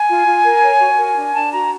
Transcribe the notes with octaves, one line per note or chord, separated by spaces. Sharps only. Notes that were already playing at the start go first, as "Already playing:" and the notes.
Already playing: G#5
F4
F4
A#4
C#5
F#4
A#4
D4
D4 A5
F#4 A#5